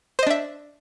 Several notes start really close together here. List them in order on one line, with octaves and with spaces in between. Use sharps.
C5 D#5 D4 E5